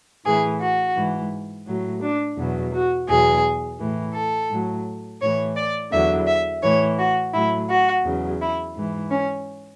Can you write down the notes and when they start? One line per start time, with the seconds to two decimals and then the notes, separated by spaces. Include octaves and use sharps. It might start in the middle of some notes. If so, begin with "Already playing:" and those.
0.25 A2 E3 G#4
0.60 F#4
0.95 G#2 E3
1.67 A2 F#3
2.01 D4
2.37 E2 B2 F#3
2.73 F#4
3.08 E2 B2 F#3 G#4
3.80 A2 E3
4.14 A4
4.50 A2 F#3
5.21 A2 E3 C#5
5.56 D5
5.92 E2 D3 F#3 E5
6.27 E5
6.62 A2 E3 C#5
6.98 F#4
7.33 A2 F#3 E4
7.69 F#4
8.05 E2 C#3 F#3
8.40 E4
8.75 G#2 E3
9.10 C#4